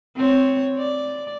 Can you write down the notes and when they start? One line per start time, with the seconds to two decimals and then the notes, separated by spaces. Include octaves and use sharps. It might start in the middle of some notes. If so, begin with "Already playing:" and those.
0.17 C4 C#5
0.78 D5